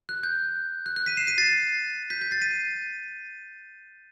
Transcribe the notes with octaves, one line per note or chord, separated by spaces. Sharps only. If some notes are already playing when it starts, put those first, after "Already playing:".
F#6
G6
F#6
F#6
B6 D#7
C7 E7
B6 D#7
A6 C7
G6 B6
G6 B6
A6 C7
B6 D#7